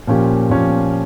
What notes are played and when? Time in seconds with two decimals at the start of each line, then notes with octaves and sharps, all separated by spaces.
0.07 A#2 F3 C#4 G4
0.50 A#2 F3 C#4 G4